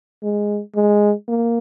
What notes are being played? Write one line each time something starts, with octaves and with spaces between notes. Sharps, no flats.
G#3
G#3
A#3